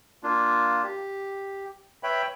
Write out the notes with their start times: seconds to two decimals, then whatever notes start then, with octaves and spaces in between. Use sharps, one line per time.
0.23 A#3 D4 F4
0.84 G4
2.03 B4 C#5 E5 G5 B5